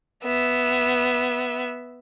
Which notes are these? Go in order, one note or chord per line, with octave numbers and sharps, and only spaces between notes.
B3 E5